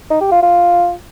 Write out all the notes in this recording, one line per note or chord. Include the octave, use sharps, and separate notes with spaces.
D#4
G4
F4
F4